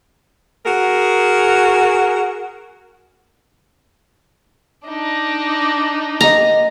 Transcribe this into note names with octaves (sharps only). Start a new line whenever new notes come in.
F#4 G#4 A#4
D4 D#4
A#3 G4 D#5 A#5